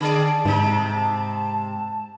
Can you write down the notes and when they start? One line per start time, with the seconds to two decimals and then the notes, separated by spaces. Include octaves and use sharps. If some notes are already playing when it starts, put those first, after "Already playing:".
0.01 D3 G#4 D5 A5
0.45 G#2 C3 D#4